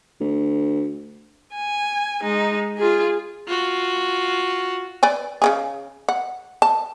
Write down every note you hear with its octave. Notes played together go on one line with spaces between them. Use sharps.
D2
G#5
G#3 D#4
F4 G#4
F4 F#4
B4 D5 G#5
C#3 E3 G#4
F#5
A5